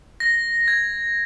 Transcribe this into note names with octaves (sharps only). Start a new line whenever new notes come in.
A#6
G#6